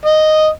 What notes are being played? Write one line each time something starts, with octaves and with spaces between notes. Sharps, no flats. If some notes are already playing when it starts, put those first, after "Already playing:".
D#5